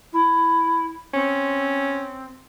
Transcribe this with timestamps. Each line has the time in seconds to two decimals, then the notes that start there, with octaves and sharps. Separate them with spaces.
0.12 E4
1.14 C4 C#4